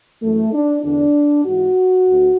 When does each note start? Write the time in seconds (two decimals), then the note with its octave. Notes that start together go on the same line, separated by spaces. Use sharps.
0.21 F#2 E3 A3
0.53 D4
0.83 E2 D3 D4
1.45 G#2 E3 F#4
2.08 D2